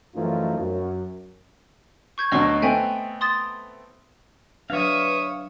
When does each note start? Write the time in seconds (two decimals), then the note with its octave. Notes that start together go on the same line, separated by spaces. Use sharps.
0.16 F#2 E3 F3 A3 D#4 F4
0.59 F#2
2.18 C#6 G6 G#6
2.32 D2 B2 F#3 D#5 C#6
2.62 A3 B3 C4 E5 G5 G#5
3.21 C6 D#6 A6
4.70 F#3 D4 B4 C#5 E5 F5 D#6